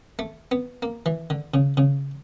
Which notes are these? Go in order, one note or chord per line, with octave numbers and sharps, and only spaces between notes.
A3
B3
A#3
E3
D3
C#3
C#3